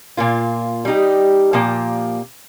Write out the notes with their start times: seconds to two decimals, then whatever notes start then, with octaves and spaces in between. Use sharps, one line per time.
0.17 A#2 A#3 F4
0.85 G3 D#4 G4
1.53 A#2 F3 A#3 G4